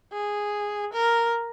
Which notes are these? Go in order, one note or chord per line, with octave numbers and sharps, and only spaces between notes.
G#4
A#4